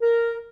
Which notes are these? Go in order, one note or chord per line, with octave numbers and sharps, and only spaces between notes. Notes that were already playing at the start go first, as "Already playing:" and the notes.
A#4